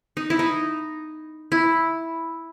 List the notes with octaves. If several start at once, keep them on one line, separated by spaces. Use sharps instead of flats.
D#4
E4
D#4
E4